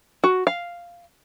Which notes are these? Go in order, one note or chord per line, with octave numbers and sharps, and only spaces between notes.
F#4
F5